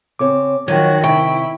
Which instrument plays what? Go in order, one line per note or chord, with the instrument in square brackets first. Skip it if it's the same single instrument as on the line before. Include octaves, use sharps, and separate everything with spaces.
[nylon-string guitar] C#3 C4 C#5 [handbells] D6
[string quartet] D#3 F#4 [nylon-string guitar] F3 [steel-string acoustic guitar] F#3 [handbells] G5 G#6
[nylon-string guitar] C3 [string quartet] E4 [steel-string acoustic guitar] G5 [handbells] C#6